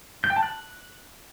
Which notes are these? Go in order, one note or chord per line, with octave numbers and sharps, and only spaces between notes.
G6
G5
A5
F#6